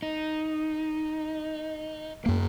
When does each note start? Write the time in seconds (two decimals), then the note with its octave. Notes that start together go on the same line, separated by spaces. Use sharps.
0.03 D#4
2.26 F#2 A#3